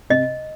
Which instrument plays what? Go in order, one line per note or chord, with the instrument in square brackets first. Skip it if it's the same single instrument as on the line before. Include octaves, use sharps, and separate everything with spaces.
[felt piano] C3 [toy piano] D#5